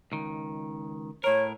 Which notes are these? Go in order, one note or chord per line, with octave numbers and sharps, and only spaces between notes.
C#2 D#3
A2 A#4 C#5